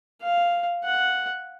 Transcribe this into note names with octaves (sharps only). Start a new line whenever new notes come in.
F5
F#5